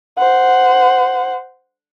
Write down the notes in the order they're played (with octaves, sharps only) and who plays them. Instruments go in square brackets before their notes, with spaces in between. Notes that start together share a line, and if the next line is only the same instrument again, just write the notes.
[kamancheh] C5 F#5